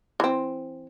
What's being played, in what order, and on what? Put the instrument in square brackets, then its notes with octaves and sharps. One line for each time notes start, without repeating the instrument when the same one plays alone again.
[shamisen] E3 C4